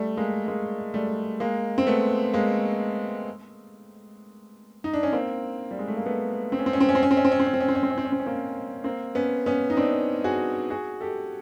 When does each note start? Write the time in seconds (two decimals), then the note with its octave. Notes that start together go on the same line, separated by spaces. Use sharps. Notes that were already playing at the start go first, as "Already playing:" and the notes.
Already playing: G3 A3
0.17 G#3 A#3
0.48 G#3 A#3
0.94 G3 A3
1.40 G#3 A#3
1.78 C4
1.87 A3 B3
2.33 G#3 A#3
4.84 D#4
4.93 D4
5.03 C#4
5.13 A#3 C4
5.71 G3
5.79 G#3
5.88 A3
5.97 A#3
6.06 A3 B3
6.52 C4
6.59 C#4
6.66 C4
6.73 C#4
6.80 C4
6.89 C#4
6.95 C4
7.03 C#4
7.11 C4
7.17 C#4
7.25 C4
7.32 C#4
7.39 C4
7.46 C#4
7.54 C4
7.60 C#4
7.69 C4
7.75 C#4
7.83 C4
7.90 C#4
7.98 C4
8.05 C#4
8.12 C4
8.20 C#4
8.27 A#3 C4
8.84 A#3 C4
9.15 B3 C#4
9.46 B3 C#4
9.70 D#4
9.77 C4 D4
10.24 F#4 G#4
10.70 F#4 G#4
11.01 G4 A4